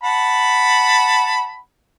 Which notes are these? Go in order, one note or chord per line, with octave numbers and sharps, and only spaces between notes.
F#5 A5 B5